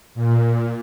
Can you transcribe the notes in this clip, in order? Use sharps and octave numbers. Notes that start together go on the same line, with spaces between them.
A#2